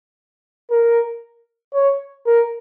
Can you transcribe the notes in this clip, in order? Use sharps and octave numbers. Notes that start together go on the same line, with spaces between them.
A#4
C#5
A#4